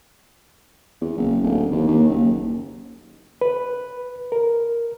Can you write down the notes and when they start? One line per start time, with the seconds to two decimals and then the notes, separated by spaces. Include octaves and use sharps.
1.01 E2
1.18 F#1
1.44 D1
1.72 D#2
1.88 D#2
2.09 F#1
3.41 B4
4.32 A#4